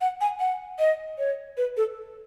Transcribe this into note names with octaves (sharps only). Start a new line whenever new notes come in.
F#5
G#5
F#5
D#5
C#5
B4
A4